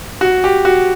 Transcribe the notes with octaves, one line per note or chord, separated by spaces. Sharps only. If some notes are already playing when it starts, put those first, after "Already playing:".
F#4
G4
F#4